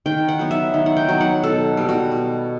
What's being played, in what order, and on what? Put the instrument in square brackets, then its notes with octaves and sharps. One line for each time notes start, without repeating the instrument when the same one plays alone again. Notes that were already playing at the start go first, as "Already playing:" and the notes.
[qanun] D#3 G5
F#5
F#3 B3
E5
D#3
F#5
G5
F#3 B3
F#5
B2 A4
G3 B3
F#4
B2